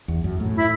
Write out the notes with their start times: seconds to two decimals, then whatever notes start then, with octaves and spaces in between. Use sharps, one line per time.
0.08 E2
0.24 F#2
0.40 A2
0.56 E4